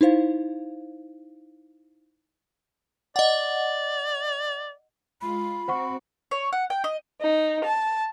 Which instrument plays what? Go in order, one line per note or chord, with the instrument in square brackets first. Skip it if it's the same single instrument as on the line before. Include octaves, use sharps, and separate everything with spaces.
[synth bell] D#4 E4 C5 F5
[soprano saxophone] D5 [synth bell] D#5 F#5
[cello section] G#3 F4 [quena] B5
[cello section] C4 F#4 [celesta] C5 F#5 C#6
[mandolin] C#5
F#5
G5
D#5
[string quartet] D#4
A5